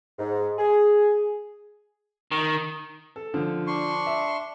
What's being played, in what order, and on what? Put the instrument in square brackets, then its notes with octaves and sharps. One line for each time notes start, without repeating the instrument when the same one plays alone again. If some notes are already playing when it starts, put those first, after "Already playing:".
[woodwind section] G#2
G#4
[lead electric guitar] D#3
[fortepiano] A4
D3 F3
[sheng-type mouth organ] D4 C6 C#6
[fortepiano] E5